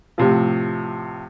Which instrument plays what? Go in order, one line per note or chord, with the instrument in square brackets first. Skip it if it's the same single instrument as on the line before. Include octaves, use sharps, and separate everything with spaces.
[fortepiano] A2 C3 F3